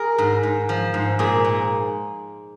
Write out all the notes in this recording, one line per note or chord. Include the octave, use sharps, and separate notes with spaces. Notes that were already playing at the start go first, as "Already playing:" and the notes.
Already playing: G#4 A#4
G#2
G#2
F3
G#2
A#2 G#4
A#2